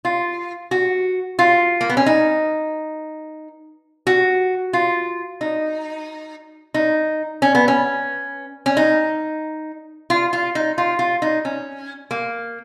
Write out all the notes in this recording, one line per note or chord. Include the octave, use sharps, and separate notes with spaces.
F4
F#4
F4
A#3
B3
C#4
D#4
F#4
F4
D#4
D#4
C#4
B3
C#4
C#4
D#4
F4
F4
D#4
F4
F4
D#4
C#4
A#3